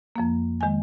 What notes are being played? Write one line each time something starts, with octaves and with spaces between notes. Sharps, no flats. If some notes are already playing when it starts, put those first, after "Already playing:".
F2 F3 A#3
D#3 G#3 G#5